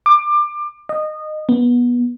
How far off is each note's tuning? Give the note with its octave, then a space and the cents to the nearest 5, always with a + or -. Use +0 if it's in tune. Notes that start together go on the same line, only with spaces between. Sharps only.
D6 +25
D#5 -20
B3 -20